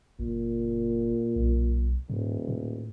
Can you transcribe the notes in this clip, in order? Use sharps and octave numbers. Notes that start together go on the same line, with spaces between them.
F#1 A#2
B1
D#1 G#2
A2